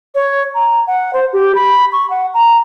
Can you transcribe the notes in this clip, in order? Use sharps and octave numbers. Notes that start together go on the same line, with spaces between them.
C#5
A#5
F#5
C5
G4
B5
C#6
F#5
A#5